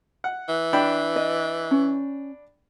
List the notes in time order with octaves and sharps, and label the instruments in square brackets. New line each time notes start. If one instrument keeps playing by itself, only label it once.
[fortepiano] F#5
[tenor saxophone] E3
[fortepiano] D4 G5 B5
[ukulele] D#5
C#4